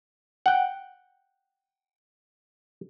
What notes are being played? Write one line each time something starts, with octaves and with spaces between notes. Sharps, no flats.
F#5 G5